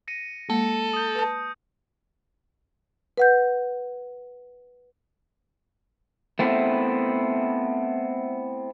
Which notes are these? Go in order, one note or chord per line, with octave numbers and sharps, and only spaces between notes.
A#6 C#7 D#7
G#3 A#3 A4 C#7
D#6 G6
B4 A5
B4 F#5 G6
A3 B3 C4 E4